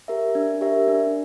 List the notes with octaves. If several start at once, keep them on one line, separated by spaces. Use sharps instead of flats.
G4 A#4 E5
D4
G4 A#4 E5
D4